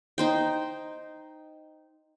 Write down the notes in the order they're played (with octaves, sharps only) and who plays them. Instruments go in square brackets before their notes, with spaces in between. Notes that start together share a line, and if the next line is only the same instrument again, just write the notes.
[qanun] D#4 C5 G5